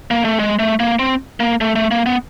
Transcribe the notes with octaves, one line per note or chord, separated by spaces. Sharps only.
A#3
A3
G#3
A3
A#3
C4
A#3
A3
A3
A#3
B3